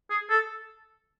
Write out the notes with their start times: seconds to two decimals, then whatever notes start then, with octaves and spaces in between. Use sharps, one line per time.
0.10 G#4
0.30 A4